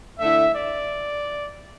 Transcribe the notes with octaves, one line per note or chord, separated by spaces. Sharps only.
D3 A3 E4 E5
D5